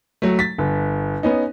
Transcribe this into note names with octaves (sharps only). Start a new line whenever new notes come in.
F#3 A3
A6 B6
G1
B3 C#4 D#4